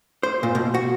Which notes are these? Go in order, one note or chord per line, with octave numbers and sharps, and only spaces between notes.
C5
A#2
B2
F#4